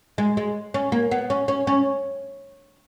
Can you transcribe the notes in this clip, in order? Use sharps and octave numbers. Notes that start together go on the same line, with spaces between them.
G#3
G#3
C#4
A#3
B3
C#4
C#4
C#4